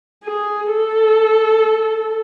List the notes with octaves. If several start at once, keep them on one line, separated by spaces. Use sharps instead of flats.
G#4
A4